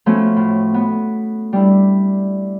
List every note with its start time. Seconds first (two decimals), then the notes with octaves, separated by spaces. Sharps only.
0.06 F3 A3 B3 C#4 F#4
0.37 A2
0.74 B3
1.53 G3 D4 E4